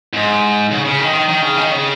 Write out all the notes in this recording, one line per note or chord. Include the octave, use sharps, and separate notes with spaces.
G#2
C#3
C#3
D#3
D#3
D#3
C#3
D#3
C#3